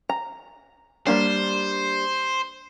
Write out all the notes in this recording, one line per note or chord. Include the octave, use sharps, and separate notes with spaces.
A#5
G3 A#3 D4 C5